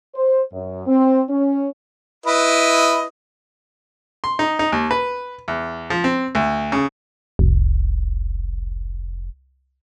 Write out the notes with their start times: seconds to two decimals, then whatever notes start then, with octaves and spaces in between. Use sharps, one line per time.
0.15 C5
0.53 F#2
0.87 C4
1.29 C#4
2.26 E4 B4 D#5
4.24 C6
4.39 D#4
4.59 D#4
4.72 D#2
4.91 B4
5.48 E2
5.90 F3
6.04 C4
6.35 D2
6.72 C#3
7.39 F1 C2